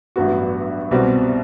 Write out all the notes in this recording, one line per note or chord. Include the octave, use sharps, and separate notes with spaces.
A1 G2 F#3 B3 F#4
C2 B2 G3 C4 F#4